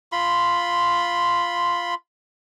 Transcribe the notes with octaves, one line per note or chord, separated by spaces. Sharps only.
F4 B5 C6